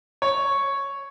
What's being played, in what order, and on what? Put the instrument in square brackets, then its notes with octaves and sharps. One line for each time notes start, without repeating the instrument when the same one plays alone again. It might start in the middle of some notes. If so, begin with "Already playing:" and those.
[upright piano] C#5